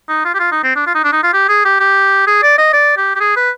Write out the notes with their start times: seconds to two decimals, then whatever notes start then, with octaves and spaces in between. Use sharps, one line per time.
0.09 D#4
0.25 F4
0.34 G4
0.40 F4
0.52 D#4
0.64 C4
0.76 D4
0.87 F4
0.95 D#4
1.04 D4
1.12 D#4
1.23 F4
1.34 G4
1.49 G#4
1.65 G4
1.80 G4
2.27 G#4
2.43 D5
2.58 D#5
2.73 D5
2.97 G4
3.15 G4
3.20 G#4
3.37 B4